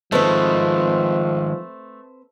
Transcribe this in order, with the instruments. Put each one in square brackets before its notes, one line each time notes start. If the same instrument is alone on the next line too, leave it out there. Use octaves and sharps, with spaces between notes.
[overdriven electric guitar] D#3 G#3 [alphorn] F3 [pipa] A3 [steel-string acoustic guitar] C4 B4 C5